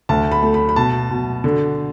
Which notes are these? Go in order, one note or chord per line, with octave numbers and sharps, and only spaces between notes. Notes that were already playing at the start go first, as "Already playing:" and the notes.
D2 A5
B5
A3
B5
B5
B2 A5
B2
D3